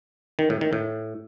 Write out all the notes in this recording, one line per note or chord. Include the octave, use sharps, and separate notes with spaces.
D#3
A2
D#3
A2